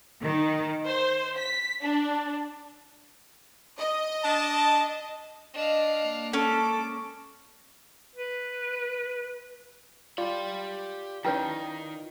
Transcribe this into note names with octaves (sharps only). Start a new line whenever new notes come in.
D#3
C5
B6
D4
D#5
D4 A5
D4 D#5 F5
A#3
C#4 A4 D6
B4
F4 G4 D5 B5
D#3 C#4 E4 B4 C#5 G5